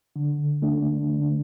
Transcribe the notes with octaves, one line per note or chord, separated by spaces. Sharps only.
D3
A3 D4
D3